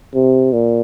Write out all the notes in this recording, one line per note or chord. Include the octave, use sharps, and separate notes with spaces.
C3
A#2